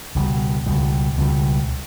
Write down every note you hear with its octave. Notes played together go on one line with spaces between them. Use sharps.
C#2 B2 G3
C#2 B2 G3
C#2 B2 G3